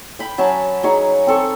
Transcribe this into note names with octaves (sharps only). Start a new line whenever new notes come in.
G5 B5
F#3 C#4 G#5 A5
F#3 D#4 G#4 C#5
C4 A4 C#6